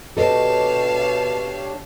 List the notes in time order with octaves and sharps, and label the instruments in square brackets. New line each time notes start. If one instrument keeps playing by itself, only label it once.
[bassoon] B2 [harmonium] D4 G4 C#5 [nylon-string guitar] A4 D#5 [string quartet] F5 A5